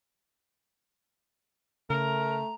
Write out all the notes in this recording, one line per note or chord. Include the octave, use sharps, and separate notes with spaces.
C#3 A3 A#4 A#5